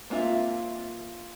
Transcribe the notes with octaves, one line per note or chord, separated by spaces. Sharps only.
A#3 C4 F4 A4 E5